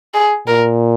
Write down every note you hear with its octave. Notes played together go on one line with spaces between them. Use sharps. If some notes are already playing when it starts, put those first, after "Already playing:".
G#4
A#2 A#4